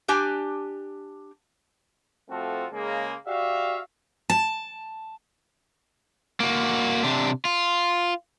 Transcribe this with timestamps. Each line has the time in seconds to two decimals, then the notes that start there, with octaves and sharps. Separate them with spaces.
0.08 D4 G4 G#5
2.29 F3 A3 C4 F4 F#4 A4
2.72 C#3 G#3 A#3 G#4
3.26 F#4 G4 D5 E5 F5
4.30 A5
6.40 A#3 F#4
7.03 C3 D4
7.45 F4